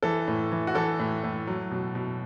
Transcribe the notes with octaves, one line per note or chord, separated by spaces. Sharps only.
E3 A4
A2
E3
F#4
E3 A4
A2
A2
F#3
B2
B2